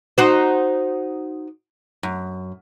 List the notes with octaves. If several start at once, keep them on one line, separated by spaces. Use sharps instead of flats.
D#4 F#4 C5
F#2